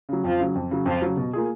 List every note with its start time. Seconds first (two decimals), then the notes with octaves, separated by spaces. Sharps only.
0.09 C#3 F#3
0.24 F2 F3 F4
0.40 C#3 F#3
0.55 F2
0.71 C#3 F#3
0.86 F2 F3 F4
1.02 C#3 F#3
1.17 B2
1.33 A#3 F4 G#4